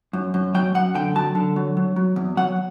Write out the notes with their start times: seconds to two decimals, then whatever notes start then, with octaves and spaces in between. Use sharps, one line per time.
0.13 F#2
0.34 F#2
0.54 F#3 G5
0.75 F#2 F#5
0.95 D3 G5
1.15 F#3 A5
1.35 D3
1.56 F#3
1.77 F#3
1.96 F#3
2.16 E2
2.37 F#3 F#5